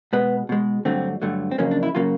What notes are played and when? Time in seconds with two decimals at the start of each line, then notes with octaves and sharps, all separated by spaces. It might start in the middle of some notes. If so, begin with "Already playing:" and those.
0.13 B2 G#3 B3
0.49 B2 G#3
0.85 G2 D3 F#3 A3 C4
1.22 G2 D3 F#3 A3
1.51 C4
1.58 F2 C#3 F#3 A#3 C#4
1.71 D4
1.83 E4
1.95 C#3 F#3 A#3 F4